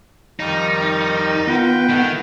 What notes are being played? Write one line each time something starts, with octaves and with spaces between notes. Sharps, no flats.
F2 D#3 G3 D#4
B3 F4 B4 F#5 G5
D#3 A3